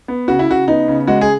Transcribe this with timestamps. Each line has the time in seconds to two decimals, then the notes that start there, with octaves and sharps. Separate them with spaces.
0.08 B3
0.28 C#3 F#4
0.39 E4
0.48 C#3 F#4
0.68 B3 D#4
0.88 C#3
1.07 G#3 F#4
1.21 G#4